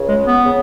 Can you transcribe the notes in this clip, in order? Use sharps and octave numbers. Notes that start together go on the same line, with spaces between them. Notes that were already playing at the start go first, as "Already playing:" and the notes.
Already playing: C#2 C#3
G#3
B3
C#3